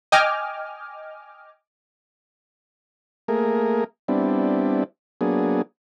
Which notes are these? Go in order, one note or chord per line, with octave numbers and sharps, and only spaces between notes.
D#5 G5 G#5 D6 F6
A3 A#3 G#4 A#4
G3 B3 C4 D4 E4
F#3 A#3 B3 D4 G#4